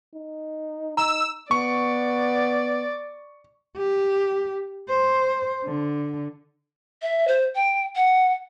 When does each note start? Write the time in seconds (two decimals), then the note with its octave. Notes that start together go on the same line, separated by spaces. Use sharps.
0.15 D#4
0.97 D#4 A#5 E6
1.51 B3 D5 C#6
3.77 G4
4.89 C5
5.65 D3
7.02 E5
7.28 C5
7.55 G5
7.96 F#5